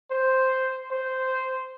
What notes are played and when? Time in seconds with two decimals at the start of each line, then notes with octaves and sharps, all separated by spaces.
0.11 C5
0.91 C5